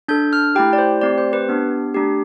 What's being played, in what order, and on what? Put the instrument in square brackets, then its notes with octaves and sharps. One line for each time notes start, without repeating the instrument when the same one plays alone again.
[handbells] D4 A4 G6
F6
A3 E4 G4 G5
D5
C5
A3 C4 G4 D5
C5
B4
B3 D4 G4
A3 D4 G4